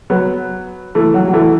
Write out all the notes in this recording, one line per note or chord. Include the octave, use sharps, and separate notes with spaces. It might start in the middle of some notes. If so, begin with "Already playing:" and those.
F#3 B3
E3 A3
F#3
F#3
E3 A3